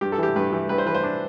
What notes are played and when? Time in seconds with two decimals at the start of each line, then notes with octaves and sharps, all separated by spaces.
0.01 G2 G4
0.12 A4
0.18 E3 G4
0.36 G2 B4
0.53 E3
0.69 G2 B4
0.78 C5
0.86 E3 B4
0.95 C5
1.04 D4